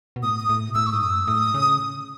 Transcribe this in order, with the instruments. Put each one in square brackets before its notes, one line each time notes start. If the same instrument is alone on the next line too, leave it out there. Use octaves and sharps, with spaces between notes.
[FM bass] B2
[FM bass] A2 [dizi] D#6
[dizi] D#6
[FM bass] A2
B2
[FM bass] A2 [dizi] E6
[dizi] C#6
[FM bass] G#2 [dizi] D#6
[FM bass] F#2
[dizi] E6
[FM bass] A2 [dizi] D#6
[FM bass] C#3